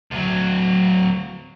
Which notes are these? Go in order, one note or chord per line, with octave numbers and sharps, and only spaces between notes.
D2 F#3